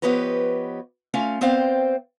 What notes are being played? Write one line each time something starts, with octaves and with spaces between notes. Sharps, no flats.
F3 B3 G4 B4 C#5 D#5
A3 C#4 F4 F5
B3 C4 C5 D5 F5 G5